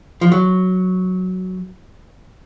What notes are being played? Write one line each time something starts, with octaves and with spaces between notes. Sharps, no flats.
F3
F#3